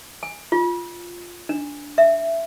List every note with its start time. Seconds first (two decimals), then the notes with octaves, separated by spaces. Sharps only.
0.23 G#5
0.52 F4
1.49 D4
1.98 E5